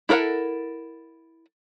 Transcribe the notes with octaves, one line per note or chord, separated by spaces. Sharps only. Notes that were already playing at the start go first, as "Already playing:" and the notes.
E4 A4 A#4 C5 F#5